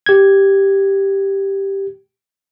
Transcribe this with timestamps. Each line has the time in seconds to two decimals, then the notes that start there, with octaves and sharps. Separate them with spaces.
0.06 G4 G#6